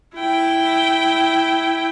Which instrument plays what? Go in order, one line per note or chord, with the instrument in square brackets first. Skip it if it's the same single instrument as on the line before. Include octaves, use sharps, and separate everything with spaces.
[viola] E4 G5